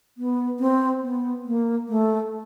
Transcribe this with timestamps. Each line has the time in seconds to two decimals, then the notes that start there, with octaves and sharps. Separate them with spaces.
0.18 B3
0.60 C4
1.03 B3
1.46 A#3
1.89 A3